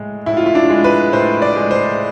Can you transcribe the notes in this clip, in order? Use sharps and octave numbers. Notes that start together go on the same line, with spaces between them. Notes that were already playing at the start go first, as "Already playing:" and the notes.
Already playing: A2 G#3
A2 E4
F4
E4
D4
G#3
B4
A2 C5
D5
G#3
C5